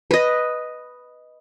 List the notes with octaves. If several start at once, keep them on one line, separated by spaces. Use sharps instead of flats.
B4 D#5